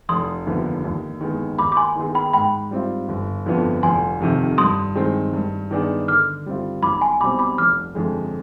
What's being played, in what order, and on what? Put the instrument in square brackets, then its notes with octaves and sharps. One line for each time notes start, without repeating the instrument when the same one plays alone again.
[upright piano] F1 [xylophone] C6 D#6
[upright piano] D#2 D3 F3 B3
D#2
D#3 G#3 B3
[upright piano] D#2 [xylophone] B5 D6
[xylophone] D6
G#5 C6
[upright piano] D#3 B3 D#4 G#4
[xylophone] G5 B5
[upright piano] G#2 [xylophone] G5 B5
[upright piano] G3 C4 F4
G1
F2 D3 F3 B3
[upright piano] F1 [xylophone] G#5 C6
[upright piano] F2 C3 D#3
[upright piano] G2 [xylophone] C6 D#6
[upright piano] D#3 G#3 C4
G2
D#3 B3 D4 G#4
[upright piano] D3 [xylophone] D6 F6
[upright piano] G3 C4 F4
[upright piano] B1 [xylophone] B5 D6
[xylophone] G#5 C6
[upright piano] B2 G3 C4 [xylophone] B5 D6
[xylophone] B5 D6
[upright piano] F1 [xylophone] D6 F6
[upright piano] F2 D3 G#3